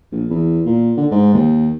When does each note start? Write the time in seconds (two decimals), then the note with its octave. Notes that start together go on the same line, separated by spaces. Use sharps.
0.12 A#1
0.30 E2
0.66 A#2
0.97 D3
1.11 G#2
1.34 D#2